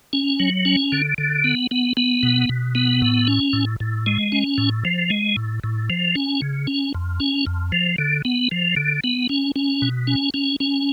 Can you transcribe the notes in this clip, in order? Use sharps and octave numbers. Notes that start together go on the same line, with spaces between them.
C#4
F#3
C#4
D3
D3
B3
B3
B3
B2
B2
B3
A2
C#4
A2
A2
G#3
C#4
A2
F3
G#3
A2
A2
F3
C#4
C#3
C#4
F2
C#4
F2
F3
D3
B3
F3
D3
B3
C#4
C#4
B2
C#4
C#4
C#4